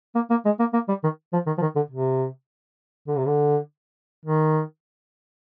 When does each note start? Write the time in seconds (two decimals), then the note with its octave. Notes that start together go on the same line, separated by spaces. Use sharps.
0.15 A#3
0.30 A#3
0.45 G#3
0.59 A#3
0.73 A#3
0.88 G3
1.03 D#3
1.33 F3
1.46 D#3
1.58 F3
1.61 D#3
1.76 D3
1.91 C3
3.07 D3
3.17 C3
3.27 D3
4.26 D#3